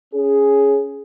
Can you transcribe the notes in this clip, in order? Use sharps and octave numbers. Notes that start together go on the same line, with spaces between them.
C#4 G#4